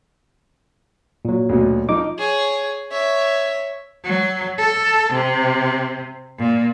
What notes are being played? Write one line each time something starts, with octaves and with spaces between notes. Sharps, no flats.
A#2 F#3
D2 B2
F3 D#4 D6
G#4 C#5
C#5 E5
F#3
A4
C3
A#2